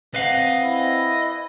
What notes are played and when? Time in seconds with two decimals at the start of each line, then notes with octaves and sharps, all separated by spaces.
0.14 C4 B4 D#5 F5 F#5
0.63 E4